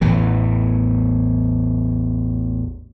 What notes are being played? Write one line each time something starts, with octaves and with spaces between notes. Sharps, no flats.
A1 E2 E3